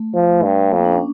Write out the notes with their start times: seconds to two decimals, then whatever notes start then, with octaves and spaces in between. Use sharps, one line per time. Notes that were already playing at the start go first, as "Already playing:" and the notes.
Already playing: A3
0.14 F3
0.43 G2
0.72 F2 A#3
0.85 D4
0.92 C#4